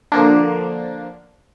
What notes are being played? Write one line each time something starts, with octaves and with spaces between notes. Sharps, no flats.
D3 F3 A#3 D4